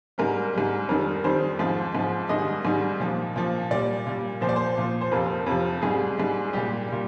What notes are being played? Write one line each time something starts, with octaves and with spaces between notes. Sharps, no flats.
G#2 G3 A#4
G#2 G3
F2 D#3 G3 A#4
F2 D#3 G3 C5
G#2 F3
G#2 F3
G#2 D#3 G3 D#5
G#2 D#3 G3
A#2 F3
A#2 F3
A#2 G3 D5
A#2 G3
A#2 F3 C5
D5
C5
A#2 F3
C5
F2 C3 F3 A#4
F2 C3 F3
G#2 G3 G#4
G#2 G3
G#4
A#2 G3 G4
A#2 G3